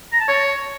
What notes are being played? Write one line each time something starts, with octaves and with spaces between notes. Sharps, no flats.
A#5
A5
C#5